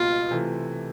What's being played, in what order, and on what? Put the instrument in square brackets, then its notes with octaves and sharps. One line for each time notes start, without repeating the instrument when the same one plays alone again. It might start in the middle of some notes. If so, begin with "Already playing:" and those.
Already playing: [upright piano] C#2 B2 G3 A#3 [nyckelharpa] F4
[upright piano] C3 E3 A3